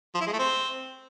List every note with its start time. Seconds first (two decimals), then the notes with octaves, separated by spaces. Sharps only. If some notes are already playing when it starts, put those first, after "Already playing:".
0.15 F3
0.21 E4
0.27 G#3
0.33 A3
0.39 C4